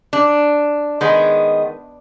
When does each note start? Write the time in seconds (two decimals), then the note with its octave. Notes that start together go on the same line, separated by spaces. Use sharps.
0.13 D4
1.01 D#3 G#3 B3